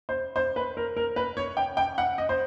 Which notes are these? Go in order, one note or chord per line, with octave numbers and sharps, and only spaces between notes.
C5
C5
B4
A#4
A#4
B4
C#5
G5
G5
F#5
D#5
C5